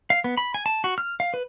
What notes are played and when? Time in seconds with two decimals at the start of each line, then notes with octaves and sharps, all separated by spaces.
0.10 F5
0.24 B3
0.37 B5
0.54 G#5
0.66 A5
0.84 F#4
0.98 F6
1.20 F5
1.34 B4